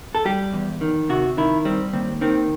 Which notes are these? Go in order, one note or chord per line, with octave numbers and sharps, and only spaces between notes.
A4
G3 G4
E2
D#3
C3 F#4
D#3 E4
G3 C4
D#2 C4
D#3 C4